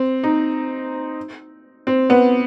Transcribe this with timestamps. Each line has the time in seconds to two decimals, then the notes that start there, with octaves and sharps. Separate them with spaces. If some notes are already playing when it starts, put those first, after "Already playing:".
Already playing: C4
0.24 D#4
1.87 C4
2.10 B3